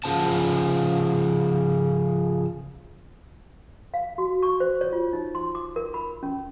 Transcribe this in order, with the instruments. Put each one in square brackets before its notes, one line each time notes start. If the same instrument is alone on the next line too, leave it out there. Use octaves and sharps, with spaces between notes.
[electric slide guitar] C#3 F3 A5
[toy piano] F5
F#4
C#6
C5
C#5
F4
D#4
C6
D6
A#4
B5
C#4